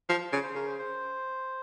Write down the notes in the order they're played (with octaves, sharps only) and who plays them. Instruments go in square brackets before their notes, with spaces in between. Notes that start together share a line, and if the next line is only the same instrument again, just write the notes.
[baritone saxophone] F3
[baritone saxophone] C#3 [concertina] C5
[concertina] C5
[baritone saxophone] C#3 [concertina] A#4
[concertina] C5
C5